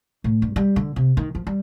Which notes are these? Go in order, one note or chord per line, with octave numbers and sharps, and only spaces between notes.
A2
G2
G3
D3
C3
D#3
F3
G3